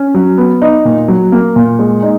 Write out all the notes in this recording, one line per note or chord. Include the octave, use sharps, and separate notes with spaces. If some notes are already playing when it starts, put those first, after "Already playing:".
Already playing: C#4
F#3
B3
D#4
A#2
F#3
A#3
A#2
G#3
D#4